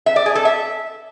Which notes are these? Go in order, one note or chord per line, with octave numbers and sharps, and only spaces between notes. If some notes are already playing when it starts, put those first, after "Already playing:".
E5
D5
G#4
A4
E5